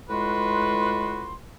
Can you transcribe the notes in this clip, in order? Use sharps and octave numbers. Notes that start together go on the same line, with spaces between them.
A2 G#3 F4 F#4 B4 C6